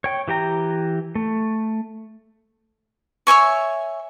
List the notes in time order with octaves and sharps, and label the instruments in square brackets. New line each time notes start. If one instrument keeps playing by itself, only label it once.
[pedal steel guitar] C#5 G5
E3 G4 G5 A#5
A3
[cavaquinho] C#5 E5 G#5 C#6